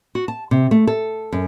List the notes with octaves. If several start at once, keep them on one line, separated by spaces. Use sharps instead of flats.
F#4
A5
C3
A3
A4
F#2